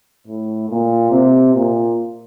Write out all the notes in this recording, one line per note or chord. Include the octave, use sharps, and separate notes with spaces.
A2
A#2
C3
A#2